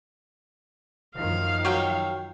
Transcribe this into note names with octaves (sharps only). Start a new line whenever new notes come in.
F#2 D#3 F3 F5
F#3 C#5 G5